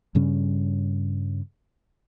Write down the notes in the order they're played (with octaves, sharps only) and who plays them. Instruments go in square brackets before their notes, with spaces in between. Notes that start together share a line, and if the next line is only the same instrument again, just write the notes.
[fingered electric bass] G2 C#3 G3 C#4